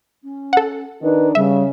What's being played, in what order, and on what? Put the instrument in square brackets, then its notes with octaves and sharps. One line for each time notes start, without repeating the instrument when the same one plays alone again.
[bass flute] C#4
[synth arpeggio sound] A4 F#5
[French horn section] D#3 D4 D#4 [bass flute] B4
[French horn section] C#3 [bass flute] G3 [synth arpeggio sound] E5